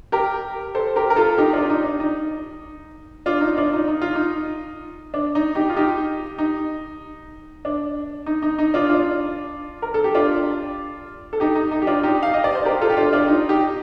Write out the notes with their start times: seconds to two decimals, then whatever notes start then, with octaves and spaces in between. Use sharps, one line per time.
0.12 G4 A#4
0.75 A4 C5
0.96 G4 A#4
1.10 A#4
1.16 F4 A4
1.38 D#4 G4
1.53 D4 F4
1.70 D#4
1.84 D4
2.00 D#4
3.26 D4 F4
3.41 D#4
3.57 D4 F4
3.73 D#4
3.88 D#4
4.02 F4
4.15 D#4
5.14 D4
5.35 D#4
5.55 D#4 G4
5.69 F4
5.77 D#4 G4
6.38 D#4
7.65 D4
8.26 D#4
8.42 D#4
8.59 D#4
8.74 D4 F4
8.89 D4 F4
9.82 A#4
9.94 A4
10.04 G4
10.15 D4 F4
11.33 A4
11.40 D#4 G4
11.56 D#4
11.71 D#4
11.82 G4
11.87 D4 F4
12.03 D#4 G4
12.23 F5
12.34 D#5
12.44 D5
12.55 C5
12.65 G4 A#4
12.81 F4 A4
12.90 G4
12.97 D4 F4
13.13 D4 F4
13.28 D#4
13.49 D#4 G4